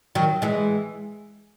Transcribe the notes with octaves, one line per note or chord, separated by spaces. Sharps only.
D#3 F#3
E3 G#3